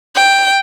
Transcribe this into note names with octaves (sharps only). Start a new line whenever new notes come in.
G5